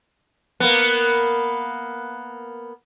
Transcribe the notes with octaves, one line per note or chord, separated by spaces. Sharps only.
A#3 B3